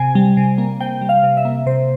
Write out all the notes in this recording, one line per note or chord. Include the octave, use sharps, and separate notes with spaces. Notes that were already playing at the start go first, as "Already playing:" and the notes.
Already playing: C3 G#5
G3
C3
A#3
C3 G5
G3
F5
C3
E5
A#3
C3 C5